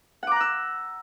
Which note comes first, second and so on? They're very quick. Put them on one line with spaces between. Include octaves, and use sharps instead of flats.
F#5 D6 A#5 F#6 E6